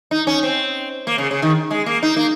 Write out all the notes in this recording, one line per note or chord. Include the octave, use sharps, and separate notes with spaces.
D#4
C#4
C4
A#3
C#3
C#3
D#3
G#3
A#3
D#4
A#3